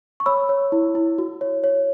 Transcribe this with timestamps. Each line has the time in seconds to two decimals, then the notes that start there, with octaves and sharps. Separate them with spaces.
0.20 C#6
0.26 C#5 B5 E6
0.49 C#5
0.72 E4
0.95 E4
1.18 F#4
1.41 C#5
1.64 C#5